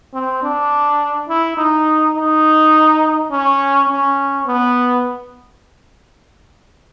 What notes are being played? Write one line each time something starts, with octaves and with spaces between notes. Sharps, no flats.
C4
D4
E4
D#4
D#4
C#4
C#4
B3